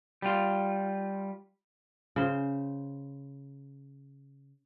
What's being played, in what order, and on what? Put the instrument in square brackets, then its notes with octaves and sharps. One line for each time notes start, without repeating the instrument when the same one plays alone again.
[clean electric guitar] G3 F4
[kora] C#3 C5